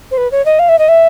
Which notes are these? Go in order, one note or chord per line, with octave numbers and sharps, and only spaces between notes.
C5
B4
C#5
D#5
F5
E5
D#5
E5